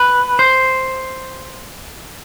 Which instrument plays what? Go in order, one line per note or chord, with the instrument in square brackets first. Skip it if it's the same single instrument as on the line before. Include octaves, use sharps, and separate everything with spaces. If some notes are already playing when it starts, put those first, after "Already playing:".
Already playing: [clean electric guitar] B4
C5